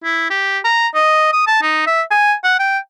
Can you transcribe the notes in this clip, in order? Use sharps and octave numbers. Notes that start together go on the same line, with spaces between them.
E4
G4
A#5
D#5
D#6
A5
D#4
E5
G#5
F#5
G5